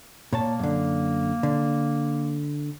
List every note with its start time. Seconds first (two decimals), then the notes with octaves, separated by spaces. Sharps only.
0.33 A#2 A#3 C#5 A5
0.59 F#2 D3
1.43 D3